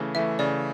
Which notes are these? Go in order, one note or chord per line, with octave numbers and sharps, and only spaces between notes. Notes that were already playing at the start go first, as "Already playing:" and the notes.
Already playing: C#3 E3 A3
E3 A3 E5
C#3 D5